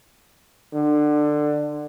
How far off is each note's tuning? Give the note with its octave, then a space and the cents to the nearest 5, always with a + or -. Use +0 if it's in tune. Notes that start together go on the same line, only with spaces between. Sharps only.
D3 +20